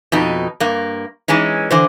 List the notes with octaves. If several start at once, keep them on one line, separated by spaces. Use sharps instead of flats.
F2 B2 D#4
G2 A#3
E3 G#3 C#4 D#4
D3 E3 C5